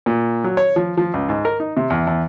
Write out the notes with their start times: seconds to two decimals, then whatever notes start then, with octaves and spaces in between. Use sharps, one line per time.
0.06 A#2
0.44 F#3
0.57 C#5
0.76 F3
0.97 F3
1.14 C#2
1.29 G#2
1.45 A#4
1.60 D#4
1.77 C3
1.90 E2
2.07 E2